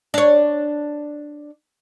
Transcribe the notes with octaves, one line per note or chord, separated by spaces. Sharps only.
D4 C#5